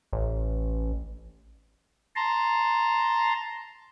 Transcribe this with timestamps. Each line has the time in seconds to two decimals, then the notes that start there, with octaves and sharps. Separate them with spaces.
0.13 A1
2.16 A5 A#5 C6